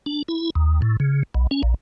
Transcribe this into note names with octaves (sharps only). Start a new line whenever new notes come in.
D4
E4
D#2
A2
C#3
B1
C#4
A#1